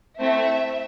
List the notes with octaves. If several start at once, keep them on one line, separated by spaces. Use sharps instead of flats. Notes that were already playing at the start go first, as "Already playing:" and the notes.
A3 C4 E4 E5